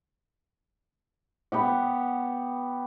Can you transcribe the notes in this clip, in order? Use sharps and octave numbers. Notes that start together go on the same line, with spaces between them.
B3 G4 F#5